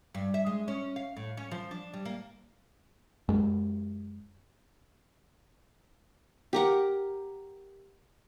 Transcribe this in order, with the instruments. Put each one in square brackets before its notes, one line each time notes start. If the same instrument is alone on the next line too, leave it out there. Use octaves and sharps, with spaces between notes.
[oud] G2
E5
G#3
C#4
F5
A2
C#4
F3
D4
G3
A#3
[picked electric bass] F#2 G#3
[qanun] G4 A#4 F#5